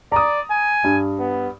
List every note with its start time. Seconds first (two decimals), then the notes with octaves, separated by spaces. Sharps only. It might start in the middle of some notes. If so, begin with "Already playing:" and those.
0.12 D5 A#5 D#6
0.51 G#5
0.84 G2
1.20 B3